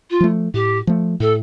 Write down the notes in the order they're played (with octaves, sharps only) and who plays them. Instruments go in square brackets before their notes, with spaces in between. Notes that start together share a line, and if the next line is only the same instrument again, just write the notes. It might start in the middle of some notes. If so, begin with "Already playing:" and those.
[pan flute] F4
[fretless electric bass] F3 A3
[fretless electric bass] A2 [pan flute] G4
[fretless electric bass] F3 A3
[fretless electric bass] A2 [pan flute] A4